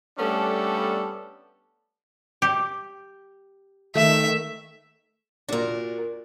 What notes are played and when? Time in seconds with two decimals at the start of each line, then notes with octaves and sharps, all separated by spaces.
0.18 G3 A3 B3 C#4 D4 A4
2.42 G4
3.95 D#3 A3 E5
5.49 A#2 D4 F#4 A#4